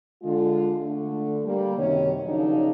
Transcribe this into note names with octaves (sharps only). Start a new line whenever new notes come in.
D3 G#3 F4
D3 A3
G3 A#3
F#2 C3 D#3 C#4 C#5
C#3 F3 F#3 A#3 D4 D#4